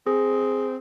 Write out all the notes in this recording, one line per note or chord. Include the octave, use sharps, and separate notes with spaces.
C4 G#4